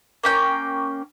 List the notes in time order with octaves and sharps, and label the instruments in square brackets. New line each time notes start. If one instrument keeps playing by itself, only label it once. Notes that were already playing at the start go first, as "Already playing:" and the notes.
[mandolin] A#3 C#4 G5